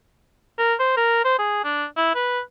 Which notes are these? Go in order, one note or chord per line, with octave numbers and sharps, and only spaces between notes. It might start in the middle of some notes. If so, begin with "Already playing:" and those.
A#4
C5
A#4
C5
G#4
D4
E4
B4